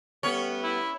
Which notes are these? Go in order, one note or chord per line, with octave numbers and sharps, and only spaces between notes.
G3 A3 B3 C#4 C#5
E4